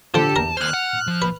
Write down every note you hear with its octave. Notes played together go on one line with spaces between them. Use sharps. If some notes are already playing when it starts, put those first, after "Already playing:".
D3 F3 G4 A4 C5 A5
E2 A#4 A#5
D#2 C5 F6 F#6
F#5
F3
B4